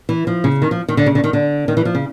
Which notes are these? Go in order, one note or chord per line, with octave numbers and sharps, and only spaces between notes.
E3
F3
C#3
D#3
F3
D#3
D3
C#3
D3
D#3
D3
D#3
E3
F3
C#3